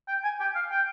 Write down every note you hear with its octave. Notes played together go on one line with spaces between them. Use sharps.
G5
G#5
G5
F5
G5